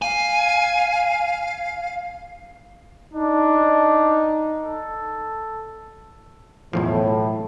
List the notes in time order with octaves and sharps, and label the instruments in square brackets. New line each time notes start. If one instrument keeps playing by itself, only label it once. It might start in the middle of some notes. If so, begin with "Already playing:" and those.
[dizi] F5 [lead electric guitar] G#5
[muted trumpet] D4 [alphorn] D#4
[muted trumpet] A4
[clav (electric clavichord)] B1 E2 F3 [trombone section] A2